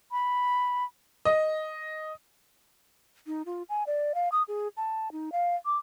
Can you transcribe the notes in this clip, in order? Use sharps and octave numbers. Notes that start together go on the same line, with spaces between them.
B5
D#5
D#4
F4
G#5
D5
F5
D#6
G#4
A5
D#4
F5
D6